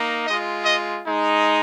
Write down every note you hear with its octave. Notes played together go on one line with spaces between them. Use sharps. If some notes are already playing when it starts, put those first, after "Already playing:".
Already playing: A#3 D#4
G#3 F4 D#5
D#5
G#3 D#4